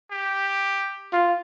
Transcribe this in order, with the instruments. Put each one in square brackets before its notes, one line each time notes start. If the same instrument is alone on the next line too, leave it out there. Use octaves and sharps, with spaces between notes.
[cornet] G4
[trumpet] F4